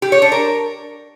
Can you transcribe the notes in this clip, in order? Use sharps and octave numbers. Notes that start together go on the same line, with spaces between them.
G4
C#5
D4
A#4